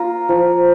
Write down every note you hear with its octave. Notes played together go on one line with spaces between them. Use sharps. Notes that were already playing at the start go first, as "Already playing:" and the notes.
Already playing: A#3 F4 A#5
F3